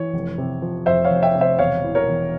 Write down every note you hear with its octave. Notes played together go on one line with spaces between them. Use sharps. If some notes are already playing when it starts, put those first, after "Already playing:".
Already playing: E3 C#5
F1
C3
F3
F2 C5 E5
C#5 F5
F1
E5 G5
C3
C5 E5
E1 C#5 F5
E3
A#4 C#5
E1